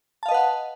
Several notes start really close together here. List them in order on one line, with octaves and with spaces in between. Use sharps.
A5 F5 D#5 B4 F#5